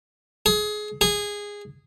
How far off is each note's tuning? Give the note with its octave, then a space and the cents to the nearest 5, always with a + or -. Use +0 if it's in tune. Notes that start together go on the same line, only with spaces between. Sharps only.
G#4 +20
G#4 -15